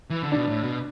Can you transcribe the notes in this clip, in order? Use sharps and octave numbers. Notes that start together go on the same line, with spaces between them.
E3
D3
B2 D4
A2
B2